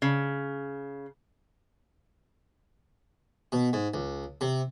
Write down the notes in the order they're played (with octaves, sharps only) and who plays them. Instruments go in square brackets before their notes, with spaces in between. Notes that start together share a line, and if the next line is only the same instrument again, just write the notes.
[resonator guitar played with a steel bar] C#3
[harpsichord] B2
G#2
C#2
C3